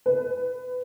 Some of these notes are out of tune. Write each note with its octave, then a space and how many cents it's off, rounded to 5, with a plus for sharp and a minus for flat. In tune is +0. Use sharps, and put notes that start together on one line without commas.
B4 +25